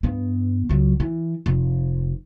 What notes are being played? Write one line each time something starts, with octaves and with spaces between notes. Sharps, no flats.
G2 B3
C#2 F#3
E3
F1